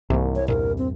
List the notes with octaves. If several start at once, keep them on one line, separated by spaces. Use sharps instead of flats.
C2 G#2 E3 A#3
C#5
E2 G2 A#2 A#4
C4